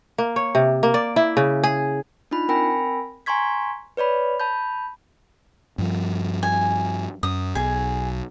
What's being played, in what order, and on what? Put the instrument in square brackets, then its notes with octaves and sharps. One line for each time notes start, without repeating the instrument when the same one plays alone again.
[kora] A#3
C#5
C3
A#3
D5
E4
C#3
G#4
[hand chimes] D4 D#4 F4 B5
C4 A#4 G5 G#5 B5 A#6
G#5 A#5 C6 C#6 G#6 B6
B4 C#5 D5 B5
A5 B5 G6
[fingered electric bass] G2 F3
[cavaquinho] G#5
[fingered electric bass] F#2 [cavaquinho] D#6
[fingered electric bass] B1 [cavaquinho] G#4